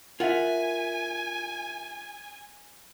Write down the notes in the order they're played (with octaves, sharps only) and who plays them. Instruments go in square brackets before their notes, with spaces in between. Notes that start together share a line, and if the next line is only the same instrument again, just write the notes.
[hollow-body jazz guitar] F4 F#5 [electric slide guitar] A#4 E5 [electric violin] G#5